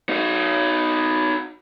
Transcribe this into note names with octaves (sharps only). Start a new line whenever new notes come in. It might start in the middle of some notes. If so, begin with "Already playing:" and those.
D#4 F#4